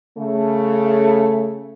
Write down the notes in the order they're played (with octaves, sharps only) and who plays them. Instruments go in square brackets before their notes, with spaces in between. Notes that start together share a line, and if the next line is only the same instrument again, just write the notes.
[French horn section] C#3 A3